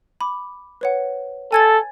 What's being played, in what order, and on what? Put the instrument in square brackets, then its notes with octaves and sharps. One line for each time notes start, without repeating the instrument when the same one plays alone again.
[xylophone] B5 D6
B4 C#5 F#5
[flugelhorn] A4 [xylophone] G#5 G#6 A6